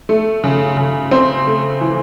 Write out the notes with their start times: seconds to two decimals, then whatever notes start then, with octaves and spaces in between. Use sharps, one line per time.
0.09 A3
0.44 C#3
0.77 C#3
1.11 C4
1.47 A3
1.81 E3